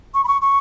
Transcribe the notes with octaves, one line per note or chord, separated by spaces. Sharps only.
C#6
B5
C#6
C#6